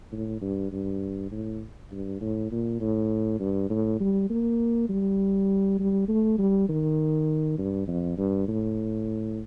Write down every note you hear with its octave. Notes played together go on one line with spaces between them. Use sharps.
A2
G2
G2
A2
G2
A2
A#2
A2
G2
A2
G3
A#3
G3
G3
A3
G3
D#3
G2
F2
G2
A2